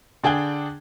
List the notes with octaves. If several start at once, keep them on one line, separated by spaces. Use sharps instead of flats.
D3 D4 G#4 G5 G#6 G7